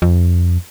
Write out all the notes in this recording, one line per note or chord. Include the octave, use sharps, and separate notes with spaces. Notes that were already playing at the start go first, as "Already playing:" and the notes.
F2